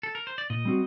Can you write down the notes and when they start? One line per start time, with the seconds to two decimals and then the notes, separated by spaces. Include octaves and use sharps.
0.03 A4
0.15 A#4
0.27 C5
0.38 D5
0.50 A#2 D#5
0.65 G3 C4 F#4